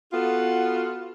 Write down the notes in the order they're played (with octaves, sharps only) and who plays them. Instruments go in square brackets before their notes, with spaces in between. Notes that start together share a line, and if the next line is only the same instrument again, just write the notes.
[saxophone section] B3 F4 F#4 A4